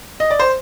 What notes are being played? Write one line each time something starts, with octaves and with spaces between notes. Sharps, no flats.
D#5
D5
C5